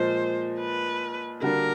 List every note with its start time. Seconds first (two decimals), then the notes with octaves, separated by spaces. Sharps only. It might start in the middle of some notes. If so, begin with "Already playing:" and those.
Already playing: A#2 F3 G#3 C5
0.60 B4
1.42 D3 G3 A#3 D4 F#4 A#4